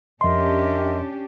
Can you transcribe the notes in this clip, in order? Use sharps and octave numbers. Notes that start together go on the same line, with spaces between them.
F2 C#4 D4 G4 A#4 D#5 E5 C6